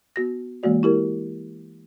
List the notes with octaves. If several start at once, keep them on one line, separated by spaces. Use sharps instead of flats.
B3 F#4 A#6
E3 G#3 A#3 F#4 D5
E4 G4 A#4